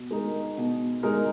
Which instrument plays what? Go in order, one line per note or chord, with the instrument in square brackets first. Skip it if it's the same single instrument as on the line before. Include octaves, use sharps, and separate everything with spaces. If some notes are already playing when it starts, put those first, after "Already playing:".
Already playing: [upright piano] B2
G#3 D#4 A#4
B2
G#3 D#4 A#4